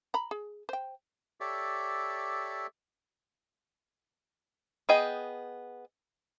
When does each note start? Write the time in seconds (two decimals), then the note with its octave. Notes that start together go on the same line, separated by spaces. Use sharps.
0.14 A#5 B5
0.31 G#4
0.69 C5 G5
1.40 G4 A4 C#5 D5 E5
4.89 B3 G#4 D#5 G5